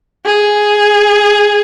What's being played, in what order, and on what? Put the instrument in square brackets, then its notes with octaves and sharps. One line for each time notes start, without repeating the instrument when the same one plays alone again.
[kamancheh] G#4